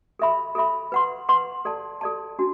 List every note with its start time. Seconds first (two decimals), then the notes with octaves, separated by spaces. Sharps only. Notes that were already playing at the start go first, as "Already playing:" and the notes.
0.19 A4 E5 B5
0.55 A4 E5 B5
0.92 B4 F#5 C6
1.29 B4 F#5 C6
1.65 A4 D5 A5
2.01 A4 D5 A5
2.39 D4 F#4